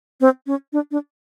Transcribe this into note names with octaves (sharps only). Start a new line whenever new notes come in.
C4
C#4
D4
D4